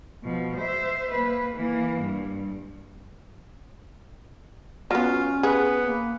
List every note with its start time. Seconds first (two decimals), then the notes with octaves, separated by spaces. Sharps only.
0.23 B2 F3
0.56 C5 E5
1.12 A#3 B4
1.56 E3 A#3
2.02 G2
4.91 F#3 B3 C#4 F4
5.43 B3 G#4
5.82 A#3